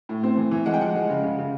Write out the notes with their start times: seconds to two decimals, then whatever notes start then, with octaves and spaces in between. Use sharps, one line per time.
0.09 A2
0.23 C4
0.37 E3
0.51 E3
0.66 G#3 F#5
0.73 G5
0.81 F3 F#5
0.95 G#3
1.09 C#3
1.23 C#3
1.38 C#3